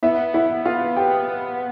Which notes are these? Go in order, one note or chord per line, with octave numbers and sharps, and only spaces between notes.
B3 E4 E5
E4 E5
F4 F5
G4 G5